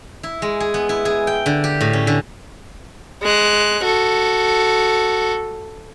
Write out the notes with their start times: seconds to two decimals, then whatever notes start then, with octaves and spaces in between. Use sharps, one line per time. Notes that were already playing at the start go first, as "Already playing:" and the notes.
0.23 E4
0.42 G#3
0.60 G#4
0.74 B3
0.89 E4
1.05 G#4
1.27 G5
1.46 D3
1.64 G4
1.81 A2
1.93 C#4
2.07 D3
3.22 G#3 F#6
3.83 F#4 A4